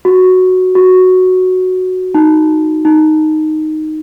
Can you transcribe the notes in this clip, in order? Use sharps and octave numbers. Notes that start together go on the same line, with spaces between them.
F#4
F#4
D#4
D#4